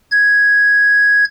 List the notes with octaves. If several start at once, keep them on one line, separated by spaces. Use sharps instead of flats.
G#6